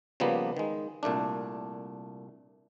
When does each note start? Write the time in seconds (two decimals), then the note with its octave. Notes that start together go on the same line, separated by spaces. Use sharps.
0.20 C#3 F3 G3 A#3 B3
0.57 D#3 G#3
1.03 C2 A#2 A3 D4